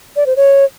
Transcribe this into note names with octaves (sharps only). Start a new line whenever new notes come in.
D5
C5
C#5